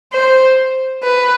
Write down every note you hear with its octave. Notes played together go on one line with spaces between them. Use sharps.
C5
B4